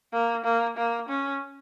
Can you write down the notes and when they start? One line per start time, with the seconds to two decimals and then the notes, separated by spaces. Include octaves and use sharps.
0.13 A#3
0.44 A#3
0.77 A#3
1.09 C#4